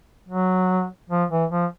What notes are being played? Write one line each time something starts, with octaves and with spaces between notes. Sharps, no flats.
F#3
F3
E3
F3